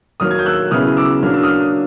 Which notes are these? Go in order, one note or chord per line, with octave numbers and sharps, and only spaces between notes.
D#3 F#3 A#3 D#6 F6
G#6
G6
E6 F#6
C#3 F#3 B3 E4 D#6 F6
D6 E6
F#3 A#3 D4 F6
E6
D#6 F6